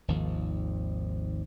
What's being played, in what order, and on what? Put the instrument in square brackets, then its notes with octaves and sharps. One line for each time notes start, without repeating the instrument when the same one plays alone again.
[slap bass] G#1 D#2 F3